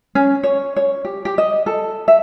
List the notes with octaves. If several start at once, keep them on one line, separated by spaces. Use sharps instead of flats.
C#4
C#5
C#5
G4
G4
D#5
A4
E5